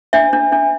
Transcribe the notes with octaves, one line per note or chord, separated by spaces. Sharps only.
D4 E5
D4
D4